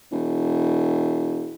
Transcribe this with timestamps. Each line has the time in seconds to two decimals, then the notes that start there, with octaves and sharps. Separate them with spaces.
0.12 E1